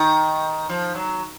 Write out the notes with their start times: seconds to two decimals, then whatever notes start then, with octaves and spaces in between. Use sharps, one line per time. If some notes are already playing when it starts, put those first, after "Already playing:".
Already playing: D#3
0.69 F3
0.95 F#3